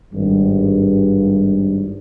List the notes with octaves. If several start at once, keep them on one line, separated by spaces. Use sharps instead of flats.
G#1 G2